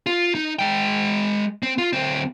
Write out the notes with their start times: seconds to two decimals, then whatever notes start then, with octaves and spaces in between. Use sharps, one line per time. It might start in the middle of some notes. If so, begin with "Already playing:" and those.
0.07 F4
0.35 D#4
0.59 G#3 G5
1.63 C4
1.78 F4
1.93 D2 C4